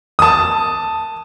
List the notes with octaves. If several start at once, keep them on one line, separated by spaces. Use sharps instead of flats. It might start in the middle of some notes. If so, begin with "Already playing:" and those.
A5 D#6